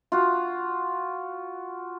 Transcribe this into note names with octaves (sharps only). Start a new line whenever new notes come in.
F4 F#4